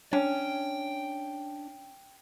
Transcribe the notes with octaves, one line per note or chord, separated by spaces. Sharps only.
C#4 D4 G5